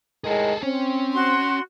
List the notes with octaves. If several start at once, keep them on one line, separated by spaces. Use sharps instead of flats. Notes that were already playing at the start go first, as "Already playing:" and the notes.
A2 D#3 G#3 G#4 A4
C4 C#4
F#4 C6